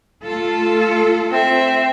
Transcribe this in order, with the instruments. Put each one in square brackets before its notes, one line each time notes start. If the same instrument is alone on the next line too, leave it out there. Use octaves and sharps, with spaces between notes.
[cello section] A3 F4 A4
[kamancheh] C4 E5